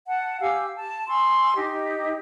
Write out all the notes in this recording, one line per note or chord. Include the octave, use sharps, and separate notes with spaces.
F#5 A5
G4 F5 G#5 E6
A5
G#5 C6 C#6 E6
D#4 G4 D#5